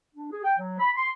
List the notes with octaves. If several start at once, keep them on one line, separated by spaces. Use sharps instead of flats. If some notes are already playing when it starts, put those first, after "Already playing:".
D4
G#4
G5
F#3
B5
C6